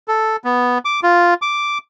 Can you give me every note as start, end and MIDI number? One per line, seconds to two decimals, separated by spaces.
0.08 0.36 69
0.44 0.78 59
0.85 1.00 86
1.03 1.34 65
1.42 1.78 86